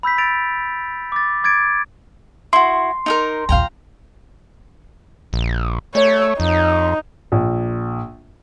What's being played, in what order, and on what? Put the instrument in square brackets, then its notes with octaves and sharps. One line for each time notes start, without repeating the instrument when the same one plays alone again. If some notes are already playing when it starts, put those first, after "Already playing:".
[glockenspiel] B5 E6 G6 B6
E6 A6 D7 F7
D6 A6
D6 G#6 A6 D7
[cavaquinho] E4 F#4 [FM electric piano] C6
[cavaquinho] D#4 G#4 A#4
[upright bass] A#1 D#2 [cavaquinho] F5 G5 A#5
[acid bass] A#1
[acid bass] A3 [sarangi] C#5
[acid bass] F2 [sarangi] D#4
[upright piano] A#1